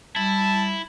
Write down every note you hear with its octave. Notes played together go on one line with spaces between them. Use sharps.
G3 E4 A5